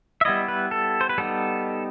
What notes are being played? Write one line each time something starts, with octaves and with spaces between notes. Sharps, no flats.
E5
G3 B3 E4 D#5
B4
A4
C5
B4
G3 B3 D#4 A4